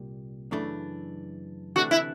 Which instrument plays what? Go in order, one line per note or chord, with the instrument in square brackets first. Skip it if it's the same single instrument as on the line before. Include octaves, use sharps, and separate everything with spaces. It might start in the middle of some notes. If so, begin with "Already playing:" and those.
Already playing: [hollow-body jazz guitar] C2 A#2 G3
F#2 C#3 E3 A3 D4
[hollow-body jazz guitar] D2 C3 E3 A3 D4 [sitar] F#4
[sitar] E4